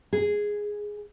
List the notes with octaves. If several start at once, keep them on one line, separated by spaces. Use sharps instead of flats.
G#4